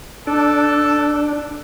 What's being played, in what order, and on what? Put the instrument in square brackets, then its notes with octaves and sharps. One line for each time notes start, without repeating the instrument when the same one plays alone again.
[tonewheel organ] D4 [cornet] A4